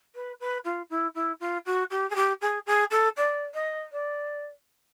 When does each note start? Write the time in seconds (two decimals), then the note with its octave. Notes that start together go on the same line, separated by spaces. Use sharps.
0.15 B4
0.40 B4
0.65 F4
0.90 E4
1.15 E4
1.40 F4
1.66 F#4
1.91 G4
2.10 G#4
2.15 G4
2.41 G#4
2.66 G#4
2.91 A4
3.17 D5
3.54 D#5
3.92 D5